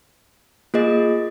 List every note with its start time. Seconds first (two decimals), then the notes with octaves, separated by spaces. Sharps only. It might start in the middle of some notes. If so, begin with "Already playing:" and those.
0.74 A#3 F4 G#4 D#5